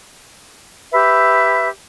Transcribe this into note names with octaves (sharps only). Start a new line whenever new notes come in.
G4 B4 E5